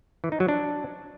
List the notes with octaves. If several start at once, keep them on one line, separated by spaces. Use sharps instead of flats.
E3
D#4
F#3
D4